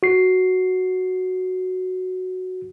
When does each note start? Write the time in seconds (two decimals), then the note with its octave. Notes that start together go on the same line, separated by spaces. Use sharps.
0.03 F#4 C7